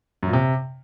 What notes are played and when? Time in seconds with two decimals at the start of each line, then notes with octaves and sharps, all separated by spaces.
0.23 F#2
0.28 A#2
0.33 C3